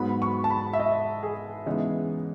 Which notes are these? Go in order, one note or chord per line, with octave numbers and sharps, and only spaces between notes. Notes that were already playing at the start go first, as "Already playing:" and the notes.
Already playing: G#2 F#3 B3 B5
C#6
A5
B5
E5
D#5
G#4
C#3 E3 G#3 B3 D#4